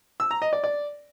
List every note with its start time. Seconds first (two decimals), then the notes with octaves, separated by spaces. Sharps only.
0.20 E6
0.31 A#5
0.42 D#5
0.53 D5
0.64 D5